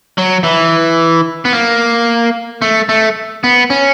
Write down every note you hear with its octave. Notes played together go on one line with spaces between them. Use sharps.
F#3
E3
B3
A#3
A3
A3
B3
C#4